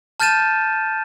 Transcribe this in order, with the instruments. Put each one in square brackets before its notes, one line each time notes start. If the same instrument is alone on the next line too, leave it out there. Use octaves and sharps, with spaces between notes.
[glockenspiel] A5 F6 G6 A6 D#7 E7